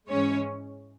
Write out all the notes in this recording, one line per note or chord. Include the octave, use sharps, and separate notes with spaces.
G#2 E3 G#3 C#4 C#5